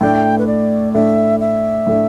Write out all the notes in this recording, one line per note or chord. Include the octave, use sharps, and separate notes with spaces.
A2 A3 D4 G5
B4
D5
A2 A3 D4 E5
E5
A2 A3 D4